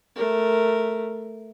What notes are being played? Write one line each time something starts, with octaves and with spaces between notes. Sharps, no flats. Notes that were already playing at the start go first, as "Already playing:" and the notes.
A3 A#4